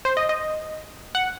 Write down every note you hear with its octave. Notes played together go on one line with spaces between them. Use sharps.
C5
D#5
D#5
F#5